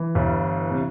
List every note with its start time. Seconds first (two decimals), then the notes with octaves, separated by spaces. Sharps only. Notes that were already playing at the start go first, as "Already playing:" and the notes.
Already playing: E3
0.15 G1 G2 G3 E4
0.71 C3